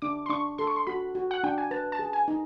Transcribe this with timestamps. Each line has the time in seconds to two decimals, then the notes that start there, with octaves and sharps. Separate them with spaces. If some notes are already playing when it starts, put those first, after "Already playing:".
0.02 D4 D6
0.26 C6
0.30 D4 C#6
0.58 A4 C6
0.67 C#6
0.76 C6
0.87 F#4 B5
1.15 F#4
1.31 F#5
1.44 D4 G5
1.58 G#5
1.71 B4 A5
1.92 A5
1.99 G#4
2.13 G#5
2.28 D#4